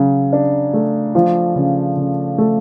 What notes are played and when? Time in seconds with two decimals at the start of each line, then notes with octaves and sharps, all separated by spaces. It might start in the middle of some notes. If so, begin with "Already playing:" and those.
Already playing: C#3 F#3
0.33 D4
0.73 A3
1.15 F3
1.55 C#3
1.96 C#3
2.38 A3